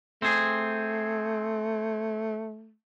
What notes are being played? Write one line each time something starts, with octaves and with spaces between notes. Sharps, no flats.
A3 C4 G#4